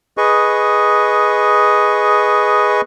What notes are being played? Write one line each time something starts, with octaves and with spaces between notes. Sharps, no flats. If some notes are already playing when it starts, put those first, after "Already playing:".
G#4 B4 D#5 C#6